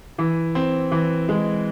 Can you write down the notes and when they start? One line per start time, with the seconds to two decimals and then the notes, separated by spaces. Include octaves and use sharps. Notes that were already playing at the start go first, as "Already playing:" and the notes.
0.18 E3
0.55 C4
0.92 E3
1.29 G#3